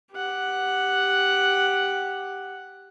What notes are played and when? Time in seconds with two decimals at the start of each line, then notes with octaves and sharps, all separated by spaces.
0.12 G4 F#5